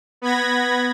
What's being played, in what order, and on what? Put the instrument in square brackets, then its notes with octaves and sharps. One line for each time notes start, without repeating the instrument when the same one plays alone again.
[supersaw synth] B3 B5 G#6 A#6